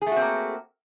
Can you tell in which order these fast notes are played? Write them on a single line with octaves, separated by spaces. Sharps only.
G#4 A3 F#4 C4 A#3